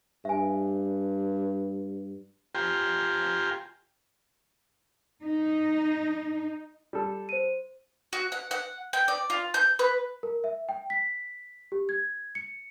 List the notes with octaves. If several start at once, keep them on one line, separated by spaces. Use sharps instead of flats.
G2 E5 G#5
F4 G4 G5 G#5 A#5 C6
D#4
G3 A4
C5 D#7
F#4
F#5
F#5
G5
D5
F4
G6
B4
A#4
E5
G5
B6
G4
G#6
C#7